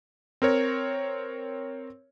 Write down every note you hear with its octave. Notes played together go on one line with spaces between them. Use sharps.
C4 A#4 C#5